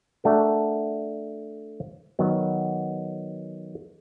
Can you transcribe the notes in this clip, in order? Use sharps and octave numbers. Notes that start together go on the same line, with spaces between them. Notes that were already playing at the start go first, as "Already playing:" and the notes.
A3 D4 F#4 A#4
D#3 F#3 B3